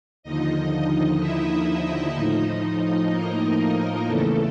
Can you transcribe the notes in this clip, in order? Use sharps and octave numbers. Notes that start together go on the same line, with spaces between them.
D#2 D3 F3 D#4 D#5
E4 E5
E4 E5
A2 F3 D#4 D#5
A#3 A#4
E2 C#3 E3 A3 A4